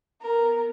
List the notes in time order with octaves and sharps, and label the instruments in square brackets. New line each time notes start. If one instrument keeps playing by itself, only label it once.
[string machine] B3 [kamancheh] A#4